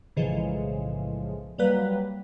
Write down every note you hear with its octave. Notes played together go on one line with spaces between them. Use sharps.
B1 A2 C#3 E3 F3 G#3
F#3 G3 A#3 B4